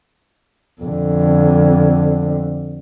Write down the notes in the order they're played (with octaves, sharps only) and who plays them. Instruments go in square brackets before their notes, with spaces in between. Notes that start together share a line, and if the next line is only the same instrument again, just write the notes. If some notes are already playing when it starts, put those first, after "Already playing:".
[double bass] F2 D3